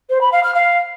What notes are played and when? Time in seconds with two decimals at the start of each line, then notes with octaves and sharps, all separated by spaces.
0.09 C5
0.21 B5
0.32 F5
0.43 F6
0.54 F5